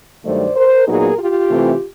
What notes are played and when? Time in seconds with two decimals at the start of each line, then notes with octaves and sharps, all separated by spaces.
0.25 G2 D#3 F#3 A3 C5 D5
0.56 A#4 C5
0.87 A#2 F#3 B3 D#4 G#4 A#4
1.19 F4 G4
1.50 C3 E3 A3 C4